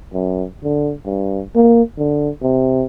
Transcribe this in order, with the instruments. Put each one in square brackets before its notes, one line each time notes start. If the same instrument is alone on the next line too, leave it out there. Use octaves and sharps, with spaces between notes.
[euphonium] F#2
D3
G2
A#3
D3
C3